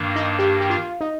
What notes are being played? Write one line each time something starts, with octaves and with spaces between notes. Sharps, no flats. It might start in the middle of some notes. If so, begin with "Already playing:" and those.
Already playing: G2 D#3 A#3 D4
D#4
G4
G4
F4
D#4